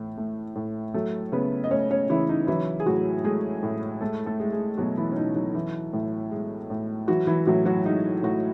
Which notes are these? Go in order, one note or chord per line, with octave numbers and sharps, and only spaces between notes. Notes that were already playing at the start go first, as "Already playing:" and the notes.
Already playing: A2 E3
A3
A2
F#3 A3 A4
C#3 B3 B4
D#5
A3 C#4 C#5
C#4 C#5
C#3 E3 E4
D#4
E3 F#3 E4
G#4
A2 F#3 F#4
G#3 A3 G#4
A2
G#3 A3 A4
A3 A4
G#3
G#3 G#4
B2 F#3 F#4
E3 E4
C#4
B2 D#4
F#3 F#4
E3
A2
G#3
A2
E3 F#3 F#4
E3 E4
A2 F#3 F#4
F#3 F#4
G#3 D#4
A2 F#3 F#4